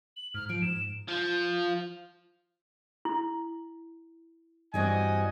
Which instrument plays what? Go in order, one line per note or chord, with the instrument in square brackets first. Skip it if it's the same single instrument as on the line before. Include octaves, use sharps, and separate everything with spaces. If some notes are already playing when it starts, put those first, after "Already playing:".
[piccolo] F#7
[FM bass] G#2 [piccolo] F6
[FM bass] F3 [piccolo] D7
[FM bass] G#2 [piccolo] E7
[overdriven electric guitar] F3
[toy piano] E4
[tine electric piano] G2 [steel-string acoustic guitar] E3 G3 C4 [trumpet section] F#4 D#5 G#5